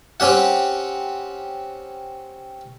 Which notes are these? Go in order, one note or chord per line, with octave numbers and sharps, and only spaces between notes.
C4 C#4 G4 F#5